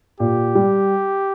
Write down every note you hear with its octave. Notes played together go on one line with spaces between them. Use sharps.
A#2 G4
G3